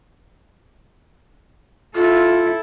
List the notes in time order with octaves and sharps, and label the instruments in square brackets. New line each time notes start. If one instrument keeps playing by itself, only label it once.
[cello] E4 A4 [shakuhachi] F4